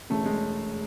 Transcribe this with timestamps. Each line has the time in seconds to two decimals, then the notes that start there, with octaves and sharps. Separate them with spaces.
0.10 E1 E2 C#3 E3 A3
0.26 G#3